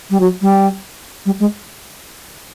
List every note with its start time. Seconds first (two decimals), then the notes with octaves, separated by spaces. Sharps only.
0.10 G3
0.20 F#3
0.41 G3
1.26 G3
1.40 G#3